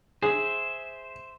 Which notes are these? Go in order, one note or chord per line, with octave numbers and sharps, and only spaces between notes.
G#4 C5 E5